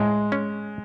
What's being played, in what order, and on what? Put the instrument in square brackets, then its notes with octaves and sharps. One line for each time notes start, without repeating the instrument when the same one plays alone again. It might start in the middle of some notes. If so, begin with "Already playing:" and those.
Already playing: [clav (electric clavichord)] A2 [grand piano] G#3
[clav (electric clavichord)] C#4